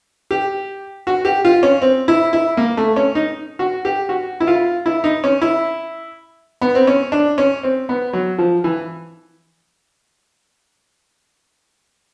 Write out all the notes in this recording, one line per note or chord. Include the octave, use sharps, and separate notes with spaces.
G4
F#4
G4
F4
C#4
C4
E4
E4
A#3
A3
C#4
D#4
F#4
G4
F#4
E4
F4
E4
D#4
C#4
E4
B3
C4
C#4
D4
C#4
C4
B3
F#3
F3
E3